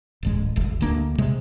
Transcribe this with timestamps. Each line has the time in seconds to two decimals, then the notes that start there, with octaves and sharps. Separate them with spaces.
0.23 D1 A1 G#3
0.56 D#1 G#1
0.81 D2 A#3 D4
1.18 C3 G#3